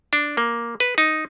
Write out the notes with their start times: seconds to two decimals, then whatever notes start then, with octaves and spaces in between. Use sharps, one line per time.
0.13 D4
0.37 A#3
0.80 B4
0.98 D#4